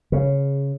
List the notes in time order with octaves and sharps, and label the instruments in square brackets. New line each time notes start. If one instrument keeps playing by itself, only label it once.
[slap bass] C#3